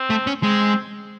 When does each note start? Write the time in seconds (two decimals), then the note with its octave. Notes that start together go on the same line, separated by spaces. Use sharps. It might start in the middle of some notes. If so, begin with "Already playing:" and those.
Already playing: C4
0.10 A3
0.27 C#4
0.43 G#3 C4